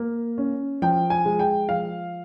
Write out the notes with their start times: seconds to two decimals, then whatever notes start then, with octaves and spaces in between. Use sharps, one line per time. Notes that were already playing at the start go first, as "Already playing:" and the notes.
Already playing: A#3
0.38 C#4
0.82 F3 G5
1.10 G#5
1.25 G#3
1.39 G5
1.69 F3 F5